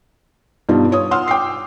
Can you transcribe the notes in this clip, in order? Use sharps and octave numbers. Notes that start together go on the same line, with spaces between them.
G2 B2 D4 D#4 F4
F4 C#5 D#6
F#5 C6 E6 F6
G5 D6 C7